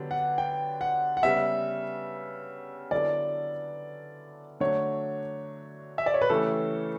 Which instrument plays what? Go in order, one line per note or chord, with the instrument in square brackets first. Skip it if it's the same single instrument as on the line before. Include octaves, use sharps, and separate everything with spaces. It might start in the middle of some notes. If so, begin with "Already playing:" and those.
Already playing: [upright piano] D3 F#3 B3 D4 G4
[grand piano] F#5
G5
F#5
F#5
[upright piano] C#3 G3 B3 [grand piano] E5
[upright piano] D3 F#3 B3 E4 A4 [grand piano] D5
[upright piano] D3 F#3 A3 D4 F#4 [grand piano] C#5
[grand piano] E5
D5
C#5
B4
[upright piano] C#3 E3 A3 C#4 G4 [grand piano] A4